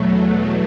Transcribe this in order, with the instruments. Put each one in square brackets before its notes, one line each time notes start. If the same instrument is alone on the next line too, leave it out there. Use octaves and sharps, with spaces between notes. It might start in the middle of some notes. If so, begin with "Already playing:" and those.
Already playing: [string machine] E2 B2 F#3 A3